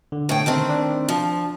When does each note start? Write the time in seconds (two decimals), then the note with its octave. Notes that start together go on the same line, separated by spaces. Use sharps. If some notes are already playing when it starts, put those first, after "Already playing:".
0.12 D3
0.29 A2 G5
0.46 D#3 A3 C4
0.69 D4
1.08 F3